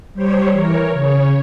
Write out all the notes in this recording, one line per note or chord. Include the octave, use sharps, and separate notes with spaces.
G3 G4 C5 C#5
E3 A#4 C#5
C#3 C#5